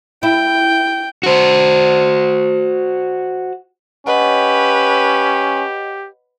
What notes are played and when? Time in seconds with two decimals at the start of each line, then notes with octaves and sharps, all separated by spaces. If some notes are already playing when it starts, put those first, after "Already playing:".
0.23 E4 G5
1.23 F#4 C5
4.07 C#4 G4 B4 C#5 D#5 F#5